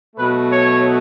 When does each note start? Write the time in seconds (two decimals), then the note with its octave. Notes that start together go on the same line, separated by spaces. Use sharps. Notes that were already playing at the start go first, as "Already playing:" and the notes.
0.16 B2 F#3 A3 B4
0.49 C#5